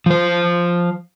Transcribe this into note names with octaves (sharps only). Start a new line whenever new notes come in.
F3 C5